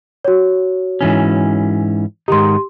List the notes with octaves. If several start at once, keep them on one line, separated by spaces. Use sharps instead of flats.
F#4 C#5
G#2 E3 C#4
G#2 D#3 D#4 G4 C6